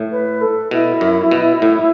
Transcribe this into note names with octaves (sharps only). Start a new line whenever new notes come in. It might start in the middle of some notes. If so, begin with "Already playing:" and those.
Already playing: A2
B4
A4
B2 E4
F#2
B2
A2